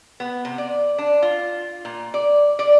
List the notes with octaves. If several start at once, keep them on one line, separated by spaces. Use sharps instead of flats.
B3
C3
D5
D4
F4
A#2
D5
D5